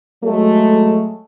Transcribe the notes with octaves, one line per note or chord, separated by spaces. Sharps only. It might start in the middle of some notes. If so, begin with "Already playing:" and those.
F#3 G#3 A3